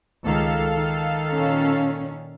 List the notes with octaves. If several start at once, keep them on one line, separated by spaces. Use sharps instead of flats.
C#2 D#3 A4 F5
D#3
A#2 C#4